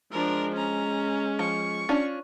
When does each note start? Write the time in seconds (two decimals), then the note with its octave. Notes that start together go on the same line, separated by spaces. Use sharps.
0.12 F3 G#3 D4 A#4
0.57 C#4 A#5
1.39 F3 C#6
1.89 C#4 D4 F4